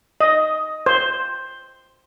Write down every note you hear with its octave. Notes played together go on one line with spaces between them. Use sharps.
D#5
C5